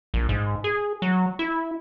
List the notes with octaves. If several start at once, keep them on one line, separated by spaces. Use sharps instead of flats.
A#1
G#2
G#4
F#3
E4